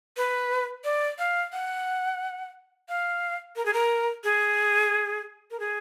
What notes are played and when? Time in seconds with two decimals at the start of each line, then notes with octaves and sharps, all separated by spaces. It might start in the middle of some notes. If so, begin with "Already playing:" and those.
0.17 B4
0.84 D5
1.19 F5
1.53 F#5
2.89 F5
3.56 A#4
3.66 G#4
3.73 A#4
4.24 G#4
5.51 A#4
5.60 G#4